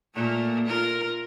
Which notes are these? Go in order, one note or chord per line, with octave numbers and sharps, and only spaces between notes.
A#2 A3 A#3
F4 A#4